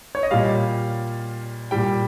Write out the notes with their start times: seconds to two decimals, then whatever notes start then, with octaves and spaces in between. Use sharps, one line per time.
0.15 C#5
0.23 D#5
0.31 A#2 G3 F5
1.71 A#2 G3 G5